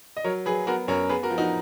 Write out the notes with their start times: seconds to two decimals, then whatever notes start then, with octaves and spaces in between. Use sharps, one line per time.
0.17 D#5
0.24 F#3 A#4 C#5
0.46 F#3 G#4 B4
0.67 B3 F#4 A#4
0.88 F#2 A#4 C#5
1.09 B3 G#4 B4
1.23 F#4 A#4
1.30 F3
1.38 D#4 F#4